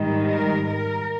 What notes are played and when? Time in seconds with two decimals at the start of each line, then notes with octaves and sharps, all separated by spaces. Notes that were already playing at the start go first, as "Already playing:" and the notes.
Already playing: G#2 D#3 G3
0.28 A#4
0.68 A#4